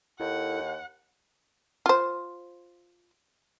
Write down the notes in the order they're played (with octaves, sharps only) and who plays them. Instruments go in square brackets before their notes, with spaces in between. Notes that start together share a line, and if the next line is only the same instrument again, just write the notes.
[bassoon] D#2 [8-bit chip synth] E4 A4 [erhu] F#5
[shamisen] F4 C5